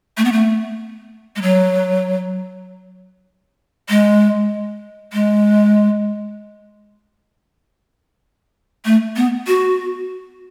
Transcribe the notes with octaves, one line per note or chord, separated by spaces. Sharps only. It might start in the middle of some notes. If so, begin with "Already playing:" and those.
A3
B3
A3
G#3
F#3
G#3
G#3
A3
B3
F#4